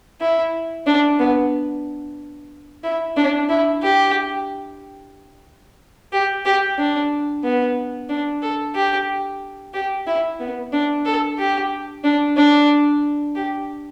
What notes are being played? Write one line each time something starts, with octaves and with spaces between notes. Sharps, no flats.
E4
D4
B3
E4
D4
E4
G4
G4
G4
D4
B3
D4
A4
G4
G4
E4
B3
D4
A4
G4
D4
D4
G4